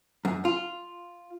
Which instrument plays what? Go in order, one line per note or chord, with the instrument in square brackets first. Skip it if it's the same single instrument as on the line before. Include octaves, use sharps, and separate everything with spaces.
[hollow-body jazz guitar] F#2
F4